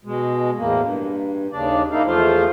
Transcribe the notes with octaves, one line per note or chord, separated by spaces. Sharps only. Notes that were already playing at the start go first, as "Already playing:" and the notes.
B2 G#3
E2 A2 A#3
G2
D#2 C#3 D4 D5
A#3 D#4 E4 F5
E2 F3 A3 F4 C5 F5